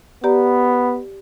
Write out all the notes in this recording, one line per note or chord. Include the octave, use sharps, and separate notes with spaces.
B3 G4 D5 A#5